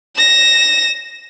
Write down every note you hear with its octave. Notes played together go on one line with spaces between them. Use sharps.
A#6 E7